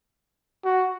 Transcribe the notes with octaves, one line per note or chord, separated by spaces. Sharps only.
F#4